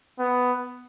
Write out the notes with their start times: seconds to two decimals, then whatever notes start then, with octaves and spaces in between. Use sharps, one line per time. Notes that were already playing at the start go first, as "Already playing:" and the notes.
0.19 B3